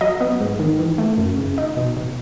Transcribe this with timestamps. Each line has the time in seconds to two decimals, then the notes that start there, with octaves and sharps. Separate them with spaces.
0.01 F#3 D#5
0.20 B3
0.40 G#2
0.59 D#3
0.79 E3
0.98 A3
1.18 F#2
1.37 C#3
1.58 D#4
1.77 B2
1.97 B2